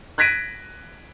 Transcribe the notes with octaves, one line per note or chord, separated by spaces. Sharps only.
F#6 G#6 A#6 B6 D7 D#7